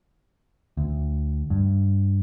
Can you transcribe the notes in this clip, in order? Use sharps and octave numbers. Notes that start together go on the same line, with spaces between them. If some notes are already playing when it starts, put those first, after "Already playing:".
D2
G2